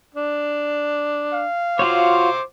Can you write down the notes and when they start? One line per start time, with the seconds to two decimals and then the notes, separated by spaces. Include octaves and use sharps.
0.14 D4
1.34 F5
1.79 F4 F#4 C5 C#5 D6